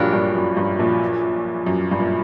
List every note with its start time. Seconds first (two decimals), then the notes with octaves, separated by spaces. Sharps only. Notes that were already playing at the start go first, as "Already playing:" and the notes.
Already playing: A#1 G2 A#2 F#3 A#3 D4 G4
0.13 G2
0.35 F#2
0.57 G2
0.78 A#1 A#2
1.66 F#2
1.91 G2
1.99 A#2